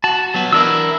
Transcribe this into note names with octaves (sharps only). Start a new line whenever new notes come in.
F#4 A5
F#3 B3 F#4
E3 D4 E4 A#4 E6